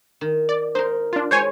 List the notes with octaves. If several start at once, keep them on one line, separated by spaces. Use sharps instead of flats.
D#3
D5
D#4 A#4 C5
D4 F4
G#3 C5 C#5 G#5